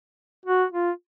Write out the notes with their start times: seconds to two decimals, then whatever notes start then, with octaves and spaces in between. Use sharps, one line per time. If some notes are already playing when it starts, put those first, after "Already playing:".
0.46 F#4
0.72 F4